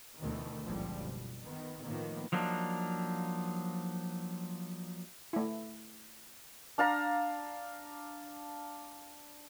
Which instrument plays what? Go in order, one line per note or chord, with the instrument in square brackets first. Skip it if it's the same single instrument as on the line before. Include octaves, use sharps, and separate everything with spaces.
[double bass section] D2 B2 D#3 E3 A3 B3
F#1 C#2 A#2 D3 F3 G3
B2
D#3 B3
A2 D#3 F3 A#3 B3
[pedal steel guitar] F3 F#3 A#3 D4 D#4
[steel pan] A3 E4
[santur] D4 F5 A5 A#5